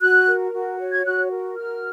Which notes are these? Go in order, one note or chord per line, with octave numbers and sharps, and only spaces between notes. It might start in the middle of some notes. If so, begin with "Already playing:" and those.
F#4 F#6
A#4
F#4
C#5
G#6
F#4 F#6
A#4
F#4 F6